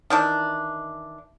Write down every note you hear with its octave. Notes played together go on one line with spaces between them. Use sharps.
D#3 E3 D4